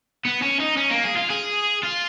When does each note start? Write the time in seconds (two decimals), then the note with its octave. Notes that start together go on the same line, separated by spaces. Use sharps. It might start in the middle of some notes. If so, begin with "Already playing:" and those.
0.25 B3
0.42 C#4
0.60 D#4
0.77 C#4
0.91 A#3
1.04 G#4
1.17 F4
1.30 G#4
1.83 F4